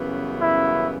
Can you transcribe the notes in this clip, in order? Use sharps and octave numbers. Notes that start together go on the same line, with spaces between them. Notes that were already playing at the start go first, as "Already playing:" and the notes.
Already playing: F#2 C#3 E3 G3 B3
E4